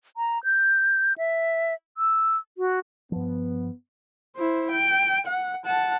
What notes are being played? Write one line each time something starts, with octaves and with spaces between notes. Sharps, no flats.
A#5
G6
E5
E6
F#4
G2 F3 B3
E4 C5
G5
F#5
F#5 A5